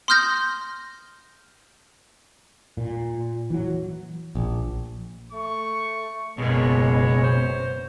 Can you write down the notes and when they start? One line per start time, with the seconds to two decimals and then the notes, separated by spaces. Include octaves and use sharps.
0.08 C6 D#6 F6 G6 A#6
2.77 A#2
3.50 E3 F#3
4.35 A#1
5.32 A3 C#6
6.38 F#1 B2 G#3 A#3 B3 C#5
7.24 C5